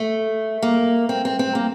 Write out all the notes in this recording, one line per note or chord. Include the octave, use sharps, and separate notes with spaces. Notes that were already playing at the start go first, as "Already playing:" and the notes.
Already playing: A3
A#3
C4
C4
C4
A#3